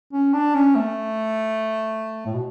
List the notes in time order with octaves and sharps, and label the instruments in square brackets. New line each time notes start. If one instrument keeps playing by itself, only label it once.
[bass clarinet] C#4
D4
C#4
A3
A2
B2